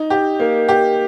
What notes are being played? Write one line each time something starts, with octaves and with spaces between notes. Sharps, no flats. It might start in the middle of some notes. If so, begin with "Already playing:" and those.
Already playing: D#4
G4
A#3
G4